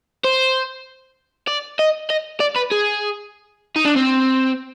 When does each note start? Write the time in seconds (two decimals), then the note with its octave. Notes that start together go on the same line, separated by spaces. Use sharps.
0.24 C5
1.47 D5
1.79 D#5
2.10 D#5
2.40 D5
2.56 B4
2.71 G#4
3.76 D#4
3.85 D4
3.96 C4